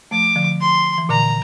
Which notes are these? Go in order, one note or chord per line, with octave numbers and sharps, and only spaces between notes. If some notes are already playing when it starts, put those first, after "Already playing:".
F3 A3 D6
D3 F3
C6
E3
A#2 D3 A#5